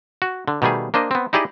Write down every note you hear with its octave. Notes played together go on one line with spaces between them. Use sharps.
F#4
D3
B2 D#3 G3 A3 G#4
A#3 D4 C5 D#5
B3 C4
D#4 E4 G4 G#4 D5 D#5